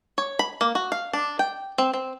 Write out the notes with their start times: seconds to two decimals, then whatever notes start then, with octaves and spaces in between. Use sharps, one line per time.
0.18 C#5
0.39 B5
0.61 A#3
0.75 F#4
0.92 F5
1.13 D4
1.39 G5
1.78 C4
1.94 C4